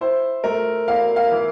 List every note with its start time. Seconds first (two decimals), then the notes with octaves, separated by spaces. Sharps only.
0.01 E4 C5
0.44 A3 A#4
0.88 E2 F5
1.16 F5
1.31 E3